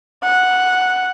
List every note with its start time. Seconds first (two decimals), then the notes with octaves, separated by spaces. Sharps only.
0.24 F#5